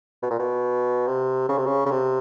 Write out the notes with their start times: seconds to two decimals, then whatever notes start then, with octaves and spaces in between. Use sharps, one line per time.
0.23 B2
0.31 A#2
0.39 B2
1.07 C3
1.49 C#3
1.58 C3
1.66 C#3
1.86 C#3
1.91 C3